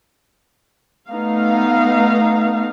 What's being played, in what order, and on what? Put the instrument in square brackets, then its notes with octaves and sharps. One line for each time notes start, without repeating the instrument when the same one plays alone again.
[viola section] A3 B3 D#4 F5